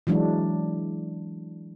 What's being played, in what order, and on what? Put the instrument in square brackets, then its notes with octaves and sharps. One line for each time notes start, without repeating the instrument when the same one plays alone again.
[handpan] E3 F#3 G#3 D4